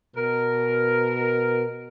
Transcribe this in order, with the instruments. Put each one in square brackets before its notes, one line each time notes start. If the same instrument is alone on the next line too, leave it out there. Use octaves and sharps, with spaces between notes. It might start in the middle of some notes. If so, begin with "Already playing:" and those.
[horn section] B2 A#4